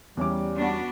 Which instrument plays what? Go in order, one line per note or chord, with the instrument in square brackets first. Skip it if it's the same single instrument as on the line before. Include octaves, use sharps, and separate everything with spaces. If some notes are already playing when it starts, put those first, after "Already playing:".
[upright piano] E2 C#4 D6 [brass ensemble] G3
[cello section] B3 D4 F#4